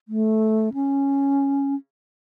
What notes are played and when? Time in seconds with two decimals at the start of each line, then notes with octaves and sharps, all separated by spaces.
0.08 A3
0.74 C#4